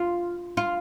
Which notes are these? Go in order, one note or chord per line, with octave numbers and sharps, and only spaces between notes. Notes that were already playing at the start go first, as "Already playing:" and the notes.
Already playing: F4
F4